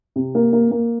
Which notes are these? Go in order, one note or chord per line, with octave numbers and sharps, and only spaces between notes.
C3
A#3
A#3
A#3